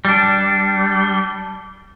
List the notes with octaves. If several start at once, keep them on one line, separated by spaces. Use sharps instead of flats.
G3 D4